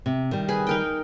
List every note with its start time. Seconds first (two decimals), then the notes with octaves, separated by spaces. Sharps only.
0.06 C3
0.31 D#3 G3
0.48 G#4 B4
0.67 D#4 A#4 G5